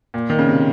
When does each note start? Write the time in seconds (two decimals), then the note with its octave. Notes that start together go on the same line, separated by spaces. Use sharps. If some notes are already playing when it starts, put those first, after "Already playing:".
0.14 A#2
0.30 D#3
0.39 C#3
0.48 C3